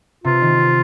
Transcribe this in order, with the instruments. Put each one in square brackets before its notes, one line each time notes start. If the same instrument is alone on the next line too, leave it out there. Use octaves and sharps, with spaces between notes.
[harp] C3 [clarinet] F4
[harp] D#3
C4